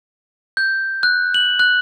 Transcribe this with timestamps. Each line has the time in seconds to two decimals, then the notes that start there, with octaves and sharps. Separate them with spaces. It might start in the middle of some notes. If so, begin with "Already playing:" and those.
0.57 G6
1.03 F#6
1.34 F#7
1.59 F#6